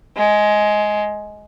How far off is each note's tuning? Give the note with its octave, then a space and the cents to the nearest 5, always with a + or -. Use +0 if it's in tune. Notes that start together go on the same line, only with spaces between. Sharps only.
G#3 +15